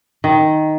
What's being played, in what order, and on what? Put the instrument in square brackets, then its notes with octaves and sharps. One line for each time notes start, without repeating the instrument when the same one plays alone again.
[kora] D#3